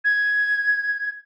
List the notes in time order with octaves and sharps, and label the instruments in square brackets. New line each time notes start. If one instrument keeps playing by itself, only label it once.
[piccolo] G#6